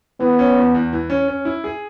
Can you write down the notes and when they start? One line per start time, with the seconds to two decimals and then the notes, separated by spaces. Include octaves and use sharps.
0.20 E3 B3
0.39 C#4
0.57 E2
0.75 E2
0.93 E3
1.10 C#4
1.28 C#4
1.45 E4
1.64 G#4